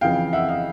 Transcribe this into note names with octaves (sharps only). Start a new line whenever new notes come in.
F2 C#3 E3 F5 G5
E5 F#5
D#5 F5